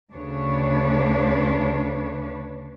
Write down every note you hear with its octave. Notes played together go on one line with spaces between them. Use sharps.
D2 C#3 D4 B4 C#5